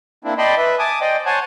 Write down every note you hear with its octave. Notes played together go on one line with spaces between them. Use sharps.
A#3 C4 D4 E4
D5 D#5 G5 A5 B5 C6
B4 E5
G#5 A5 D6 D#6
C5 D5 D#5 G5
C5 C#5 F#5 G#5 A5